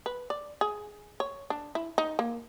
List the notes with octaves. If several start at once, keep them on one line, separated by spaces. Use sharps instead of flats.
B4
D5
G#4
C#5
D4
E4
D#4
A#3